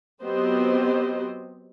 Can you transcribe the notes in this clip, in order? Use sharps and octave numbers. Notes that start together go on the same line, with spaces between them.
F#3 B3 C4 G4 C5 D#5